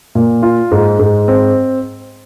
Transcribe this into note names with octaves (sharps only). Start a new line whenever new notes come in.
A#2
F4
G#2
G#2
C4